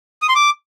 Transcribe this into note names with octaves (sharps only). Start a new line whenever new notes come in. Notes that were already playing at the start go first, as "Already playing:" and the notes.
D#6
C6
D6